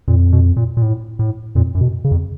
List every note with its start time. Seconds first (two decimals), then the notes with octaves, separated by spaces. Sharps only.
0.08 F2 A#2
0.33 B2
0.57 A#2
0.77 A#2
0.82 A2
1.19 A2
1.55 F2 A#2
1.75 F#2
1.81 B2
2.04 C#3
2.11 F2